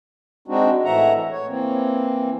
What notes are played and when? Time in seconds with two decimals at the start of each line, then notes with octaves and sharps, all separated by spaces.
0.48 G#3 C4 D4 D#4 F#4
0.85 A2 E3 A3 E5 F#5 A#5
1.31 C#5
1.47 E3 A#3 C4